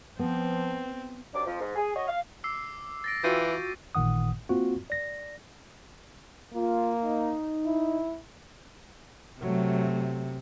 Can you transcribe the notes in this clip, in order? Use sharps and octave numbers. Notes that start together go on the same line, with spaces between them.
F3 B3 C4
F#2 C3 D4 D6
F2 F3
G#2
G#4
F#4 C#5 D#5
F5
D6 E6 C7
A6 A#6 D7
E3 F4 F#4 G5 G6 C7 D#7
A1 A#2 D#3 F#5 D#6
A#3 C4 F4 F#4
D5 A#6
A#3 F4
D#4
E4
C3 F#3 A3